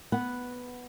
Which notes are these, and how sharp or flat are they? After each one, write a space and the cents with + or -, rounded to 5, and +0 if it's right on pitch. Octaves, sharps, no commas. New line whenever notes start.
B3 +0 F#5 +0